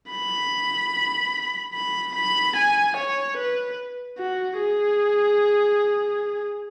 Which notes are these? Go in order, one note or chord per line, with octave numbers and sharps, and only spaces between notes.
B5
B5
B5
G#5
C#5
B4
F#4
G#4